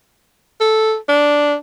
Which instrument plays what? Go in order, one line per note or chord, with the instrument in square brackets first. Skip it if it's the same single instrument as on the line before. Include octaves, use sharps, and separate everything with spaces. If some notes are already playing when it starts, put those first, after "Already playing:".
[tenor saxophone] A4
D4